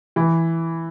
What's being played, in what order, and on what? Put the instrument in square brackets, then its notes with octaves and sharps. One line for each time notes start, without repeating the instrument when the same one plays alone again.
[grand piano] E3